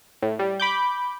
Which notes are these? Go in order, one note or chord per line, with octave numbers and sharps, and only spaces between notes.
A2
G3
B5 D6 G6